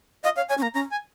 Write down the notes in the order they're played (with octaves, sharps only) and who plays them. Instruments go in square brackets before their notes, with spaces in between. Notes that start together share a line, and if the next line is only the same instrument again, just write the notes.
[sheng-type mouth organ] D#5 [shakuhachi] F5
[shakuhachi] C#5 [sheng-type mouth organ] F5
[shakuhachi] C#5 [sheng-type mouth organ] G#5
[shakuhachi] C#4
[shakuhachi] A#3 [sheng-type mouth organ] A#5
[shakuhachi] C#4 [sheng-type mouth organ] A#5
[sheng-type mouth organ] G#5